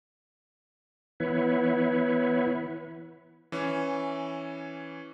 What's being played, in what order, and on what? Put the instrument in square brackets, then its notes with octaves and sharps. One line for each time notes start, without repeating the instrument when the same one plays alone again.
[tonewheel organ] E3 B3 E4 B4 C#5
[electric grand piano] E3 C#4